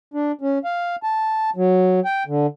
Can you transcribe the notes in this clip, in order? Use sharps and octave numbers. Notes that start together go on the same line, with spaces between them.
D4
C#4
F5
A5
F#3
G5
D3